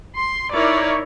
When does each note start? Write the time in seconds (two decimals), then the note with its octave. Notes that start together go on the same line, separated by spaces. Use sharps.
0.16 C6
0.52 D#4 E4 A#4 C#5 D5